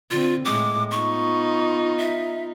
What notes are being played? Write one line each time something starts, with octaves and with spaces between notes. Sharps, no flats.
D3 C4 F4
A2 G#3 D6
B3 D#4 F4 C#6
E5